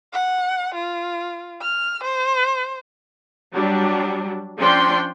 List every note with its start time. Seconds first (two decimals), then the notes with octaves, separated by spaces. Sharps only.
0.13 F#5
0.75 F4
1.61 F6
2.04 C5
3.53 F#3 G3 D4
4.60 F3 C#4 D4 G5 C6